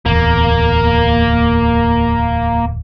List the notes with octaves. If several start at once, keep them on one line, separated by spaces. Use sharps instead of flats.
D1 E2 A#3